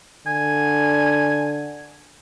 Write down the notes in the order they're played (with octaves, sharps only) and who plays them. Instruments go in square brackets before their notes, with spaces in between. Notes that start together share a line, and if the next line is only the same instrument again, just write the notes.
[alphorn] D3 [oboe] G#5